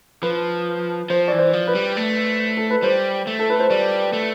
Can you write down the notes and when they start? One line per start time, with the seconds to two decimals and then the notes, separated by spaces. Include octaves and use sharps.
0.23 F3 B4
1.10 F3 C5
1.28 E3 D5
1.39 C5
1.53 F3
1.67 B4
1.75 G3
1.97 A3
2.57 A4
2.71 B4
2.83 G3 C5
3.27 A3
3.39 A4
3.50 B4
3.60 C5
3.70 G3 D5
4.13 A3